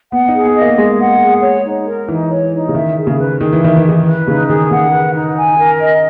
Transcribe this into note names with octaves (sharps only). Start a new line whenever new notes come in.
B3 F#5
D#4
G#4
B3
D#5
A#3
G#3 G#4
F#5
G#4
C#5
D#4
A#4
E3 D#4
C#5
D#4
C#3
D#3 E5
G#4
C#3
B4
D#3 G#4
E3
D#3 E5
E3
G#4
D#3
B4
C#3 D#4
D#3 G#4
C#3 F#5
B4
D#4
G#5
A#4
D#5